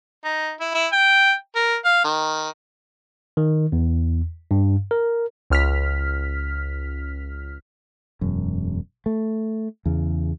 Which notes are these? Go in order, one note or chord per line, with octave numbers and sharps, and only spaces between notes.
D#4
E4
E4
G5
A#4
F5
D#3
D#3
E2
G2
A#4
C#2 F6 B6
E1 F#2
A3
E2 C#3